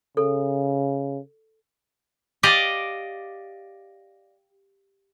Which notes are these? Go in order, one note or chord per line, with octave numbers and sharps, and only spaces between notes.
C#3 A4
G4 D5 D#5 F5